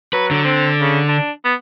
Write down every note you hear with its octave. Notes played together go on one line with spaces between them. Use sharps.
F#3 B4
D3
C4
C#3
D4
B3